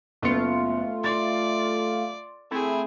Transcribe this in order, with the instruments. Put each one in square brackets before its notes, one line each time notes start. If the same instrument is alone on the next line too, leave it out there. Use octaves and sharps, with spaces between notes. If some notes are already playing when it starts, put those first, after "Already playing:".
[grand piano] F#1 B3 C#7 [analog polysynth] A3 F4
[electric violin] D5 [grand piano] C6 A6
[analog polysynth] A3 E4 [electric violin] C4 G#4